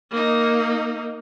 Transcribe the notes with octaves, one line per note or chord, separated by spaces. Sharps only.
A#3 D#4